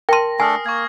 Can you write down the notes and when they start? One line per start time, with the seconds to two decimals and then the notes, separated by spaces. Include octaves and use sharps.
0.09 A#4 G5 A5 C6 A#6 D#7
0.40 A3 D4 A4 G#5 D#6 F6 C7
0.66 A#3 C#6 G#6